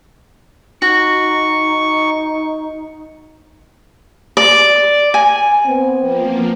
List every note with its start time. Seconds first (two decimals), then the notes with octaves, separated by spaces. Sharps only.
0.82 D#4 F#4 C#6
4.37 D5
5.14 G#5
5.66 B3 C4
6.00 F3 A#3